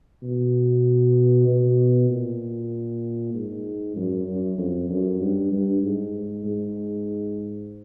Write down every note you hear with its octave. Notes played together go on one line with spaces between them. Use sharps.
B2
B2
A#2
G#2
F#2
F#2
F2
F#2
G2
G2
G#2
G#2